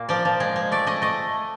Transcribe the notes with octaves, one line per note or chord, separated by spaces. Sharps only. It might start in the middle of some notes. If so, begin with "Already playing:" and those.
Already playing: A#2 A#3
F3 D5
F3
G#3
G#3
A3 D5
A3 D#5
A3 D#5